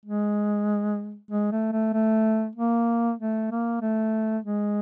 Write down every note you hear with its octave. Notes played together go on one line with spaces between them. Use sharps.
G#3
G#3
A3
A3
A3
A#3
A3
A#3
A3
G#3